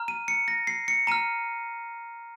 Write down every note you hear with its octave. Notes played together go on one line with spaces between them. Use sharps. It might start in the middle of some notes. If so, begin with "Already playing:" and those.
Already playing: A#5 F6
D#7
C#7
A#6
C7
C#7
A#5 F6 D#7